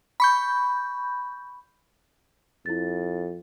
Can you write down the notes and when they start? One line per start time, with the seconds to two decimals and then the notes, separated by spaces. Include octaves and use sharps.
0.20 B5 C#6 G6
2.66 F2 E4 A6